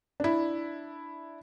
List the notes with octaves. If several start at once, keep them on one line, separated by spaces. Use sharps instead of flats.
D4 E4